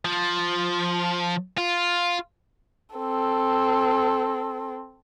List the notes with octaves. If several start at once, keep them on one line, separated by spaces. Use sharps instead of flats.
F3
F4
C4 A4